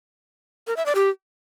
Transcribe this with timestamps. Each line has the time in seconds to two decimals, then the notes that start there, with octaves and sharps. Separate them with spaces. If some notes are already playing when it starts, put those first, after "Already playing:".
0.67 A#4
0.77 E5
0.86 D5
0.95 G4